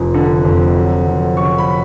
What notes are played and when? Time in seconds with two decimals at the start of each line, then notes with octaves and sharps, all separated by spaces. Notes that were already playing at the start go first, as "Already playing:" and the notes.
Already playing: F1 F3
0.14 D3
0.45 F2
0.76 F#3
1.07 F1
1.37 C#3 C#6
1.58 B5